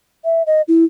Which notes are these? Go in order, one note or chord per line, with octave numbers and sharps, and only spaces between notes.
E5
D#5
E4